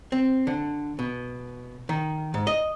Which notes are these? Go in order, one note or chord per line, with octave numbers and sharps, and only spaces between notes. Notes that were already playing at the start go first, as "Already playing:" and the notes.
C4
D3
B2
D#3
G#2
D#5